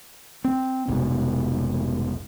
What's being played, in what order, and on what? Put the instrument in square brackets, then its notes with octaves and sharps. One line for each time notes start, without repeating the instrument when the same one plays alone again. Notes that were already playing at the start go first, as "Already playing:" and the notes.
[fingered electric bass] C4
F1 C2 G#2 B2